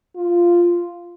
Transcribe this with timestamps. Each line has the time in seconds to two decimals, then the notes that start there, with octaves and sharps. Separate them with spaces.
0.16 F4